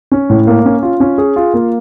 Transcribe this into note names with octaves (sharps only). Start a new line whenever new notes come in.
C#4
A2
A#3
C#4
F4
C#4
G#4
F4
A#3